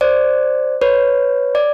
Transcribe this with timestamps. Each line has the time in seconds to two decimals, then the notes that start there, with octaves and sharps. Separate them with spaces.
0.01 C5 D5
0.81 B4 C#5
1.55 D5